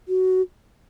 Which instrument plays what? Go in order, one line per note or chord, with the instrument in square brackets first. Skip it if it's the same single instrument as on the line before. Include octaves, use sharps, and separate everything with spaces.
[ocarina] F#4